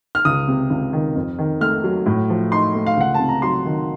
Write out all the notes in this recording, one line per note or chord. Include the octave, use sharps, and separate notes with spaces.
F6
C#2 D#6
C3
C#2
D#3
F2
D#3
A3 F6
F#3
A2
F3
D#4 C6
A3
F5
C#2 F#5
A5
C3
A#5
F#3 C6
D#3